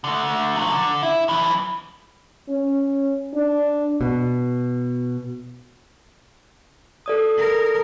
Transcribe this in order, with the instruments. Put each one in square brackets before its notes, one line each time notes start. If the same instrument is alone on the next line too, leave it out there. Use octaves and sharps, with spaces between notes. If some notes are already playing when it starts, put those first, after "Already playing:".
[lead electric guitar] D3 A3
F3 F#3
D3
E4
F#2 E3
[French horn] C#4
D4
[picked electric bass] B2
[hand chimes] A4 D5 D#6
[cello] A#4